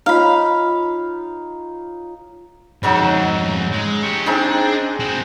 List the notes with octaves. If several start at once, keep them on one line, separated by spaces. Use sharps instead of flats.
D#4 F4 C#5 F5 B5
F2 G#2 C#3 F#3 D#4
G#3
G4 C#5
C4 D4 D#4 G#4
C4 F#4